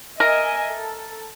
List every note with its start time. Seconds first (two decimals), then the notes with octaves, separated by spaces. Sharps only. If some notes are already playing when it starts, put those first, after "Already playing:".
0.20 A#4 D#5 E5 G#5
0.71 A4